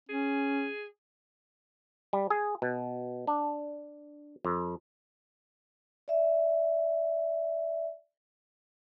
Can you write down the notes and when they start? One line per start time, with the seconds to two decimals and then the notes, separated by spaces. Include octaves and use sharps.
0.09 C#4 G#4
2.13 G3
2.30 G#4
2.62 B2
3.27 D4
4.45 F2
6.08 D5 E5